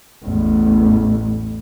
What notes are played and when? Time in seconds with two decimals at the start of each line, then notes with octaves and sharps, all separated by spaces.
0.24 A1 E2